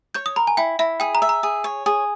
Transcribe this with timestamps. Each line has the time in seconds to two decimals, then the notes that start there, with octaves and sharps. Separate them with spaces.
0.15 C#5 G6
0.26 D#6
0.36 A#4 B5
0.47 G#5
0.57 E4 G5
0.79 E4 E5
1.00 G#4 G5
1.15 A#5
1.22 E5
1.29 A#5
1.43 G#4
1.64 C#5
1.86 G#4